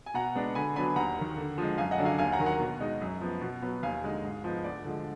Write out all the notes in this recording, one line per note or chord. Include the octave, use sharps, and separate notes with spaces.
G#5
B2 F#5 A#5
G#3 B3 D4
D3 G#5 B5
F#3 B3 D4 G#5 B5
D#2 F#5 A#5
D#3 A#3
D3
F3 G#3
F#2 F5 G#5
D#5 F#5
D3 F#3 D4
F5 G#5
D#2 F5 G#5
F#5 A#5
D#3 F#3 A#3
F#5 A#5
B2
G#3 D#4
F#2
F3 B3
B2
F#3 B3
D#2 F5 G#5
D3 G#3 D#4
G#2
F3 B3 D#4
D2 D5
D3 F3 G#3